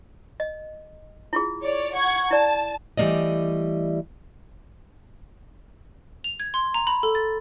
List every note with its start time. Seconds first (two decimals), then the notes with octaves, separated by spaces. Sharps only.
0.40 D#5
1.33 E4 F4 G#4
1.62 C#5 D5
1.94 F#5 C#6 G#6
2.31 E4 D5 A5
2.97 E3 G3 A3 A#3 D5 D#5
6.24 F7
6.40 G#6
6.54 C6
6.74 A#5
6.87 B5
7.03 A4
7.15 A6